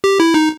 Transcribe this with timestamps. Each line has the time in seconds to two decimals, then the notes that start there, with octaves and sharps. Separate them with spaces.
0.04 G4
0.20 E4
0.34 D#4